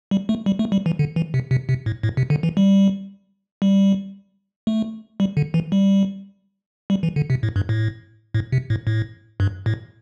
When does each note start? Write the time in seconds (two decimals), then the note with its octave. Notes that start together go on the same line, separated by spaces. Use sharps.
0.11 G3
0.29 A3
0.46 G3
0.59 A3
0.72 G3
0.86 E3
0.99 D3
1.16 E3
1.34 C3
1.51 C3
1.69 C3
1.86 A2
2.03 A2
2.17 C3
2.30 D3
2.43 E3
2.57 G3
3.62 G3
4.67 A3
5.20 G3
5.37 D3
5.54 E3
5.72 G3
6.90 G3
7.03 E3
7.16 D3
7.30 C3
7.43 A2
7.56 G2
7.69 A2
8.34 A2
8.52 C3
8.70 A2
8.87 A2
9.40 G2
9.66 A2